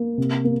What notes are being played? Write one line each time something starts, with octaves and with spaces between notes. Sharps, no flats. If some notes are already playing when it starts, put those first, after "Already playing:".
Already playing: A#3
C3
A#3